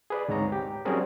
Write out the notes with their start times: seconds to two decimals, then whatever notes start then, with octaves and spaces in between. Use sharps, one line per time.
0.10 G#4 B4 D5
0.28 D2 G#2 C4 C#5 A#5
0.52 G4
0.85 F#3 G3 C4 C#4 G#4 A#4